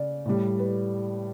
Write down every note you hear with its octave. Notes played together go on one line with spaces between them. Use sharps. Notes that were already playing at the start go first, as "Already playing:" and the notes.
Already playing: C#3 D5
A2 G3
B4